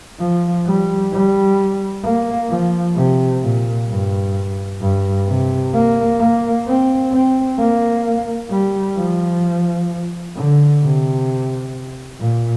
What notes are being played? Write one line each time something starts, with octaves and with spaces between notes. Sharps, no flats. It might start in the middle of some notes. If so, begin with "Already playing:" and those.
F3
G3
G3
A#3
F3
C3
A#2
G2
G2
C3
A#3
A#3
C4
C4
A#3
G3
F3
D3
C3
A#2